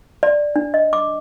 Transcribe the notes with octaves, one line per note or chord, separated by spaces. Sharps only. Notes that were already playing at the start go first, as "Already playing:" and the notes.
D5
D4
D#5
D6